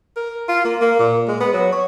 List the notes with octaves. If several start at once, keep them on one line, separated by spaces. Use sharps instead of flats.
A#4
F4
A#3
A#3
A#2
G#3
B3
F#3
C#5